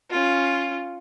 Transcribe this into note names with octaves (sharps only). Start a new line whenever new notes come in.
C#4 F4